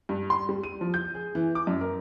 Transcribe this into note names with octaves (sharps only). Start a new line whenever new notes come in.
G2
C6
G3
D#7
F3
G6
G#4
E3
D6
F#2
A#4